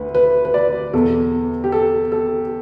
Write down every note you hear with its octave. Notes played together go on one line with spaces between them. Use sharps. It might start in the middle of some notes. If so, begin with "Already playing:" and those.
Already playing: D2 D3 B4
B4
B4
D5
E2 B2 A4
G4
A4
A4